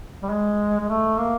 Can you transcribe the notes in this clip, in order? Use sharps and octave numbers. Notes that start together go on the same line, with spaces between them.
G3
G#3
G#3
A3
A#3